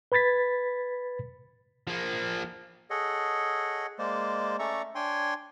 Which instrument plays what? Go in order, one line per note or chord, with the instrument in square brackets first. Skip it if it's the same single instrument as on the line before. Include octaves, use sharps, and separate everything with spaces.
[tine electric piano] B4 B5 G#6 A6 B6
[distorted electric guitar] F3 A#3
[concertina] G#4 A4 C#5 D#5 F#5
G#3 A#3 C5 D5
A3 C#4 D5 E5 A#5 C#6
D4 C#5 G5 G#5 C6